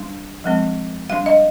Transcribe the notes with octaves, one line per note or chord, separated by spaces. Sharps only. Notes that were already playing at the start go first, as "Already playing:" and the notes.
Already playing: G3 D4
F3 G#3 C4
G3 D4 F5
D#5